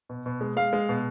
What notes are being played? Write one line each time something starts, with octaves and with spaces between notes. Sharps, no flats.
B2
B2
G#3
G#3 F5
G#3
B2